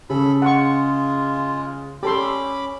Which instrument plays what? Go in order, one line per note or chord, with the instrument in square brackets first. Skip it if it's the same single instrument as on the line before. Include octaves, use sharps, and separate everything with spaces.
[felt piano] C#3 [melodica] C#4 A4 B5
[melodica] G#3 F4 [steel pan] F#5 C#6
[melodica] C#4 B5 D6 [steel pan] G4 A4 C6